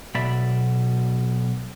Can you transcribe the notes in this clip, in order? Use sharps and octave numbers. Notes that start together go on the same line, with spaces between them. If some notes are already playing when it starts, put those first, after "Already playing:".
B1 B2 D5 E5 B5